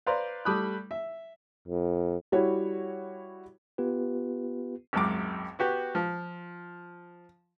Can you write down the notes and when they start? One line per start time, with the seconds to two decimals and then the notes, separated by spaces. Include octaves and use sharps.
0.06 B4 C5 D5 F5 A#5 C6
0.45 G3 A3 B5 D6 D#6 F#6
0.91 E5
1.68 F2
2.32 G3 E4 F#4 C#5
3.78 B3 F4 G4 B4
4.93 G#1 C#2 F#2 D6
5.59 B3 F#4 G4
5.95 F3